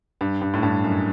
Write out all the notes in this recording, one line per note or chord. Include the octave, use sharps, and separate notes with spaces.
G2
G2
A2
G2
F#2